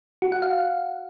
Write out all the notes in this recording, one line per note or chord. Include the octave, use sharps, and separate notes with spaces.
F#4
F#5
F5